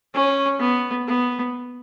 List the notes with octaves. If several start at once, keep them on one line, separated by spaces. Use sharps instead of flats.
C#4
B3
B3